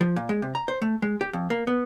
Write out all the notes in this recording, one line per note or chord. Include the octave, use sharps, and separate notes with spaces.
F3
A#2
G#3
C3
A#5
C5
A3
G#3
G4
F2
A#3
B3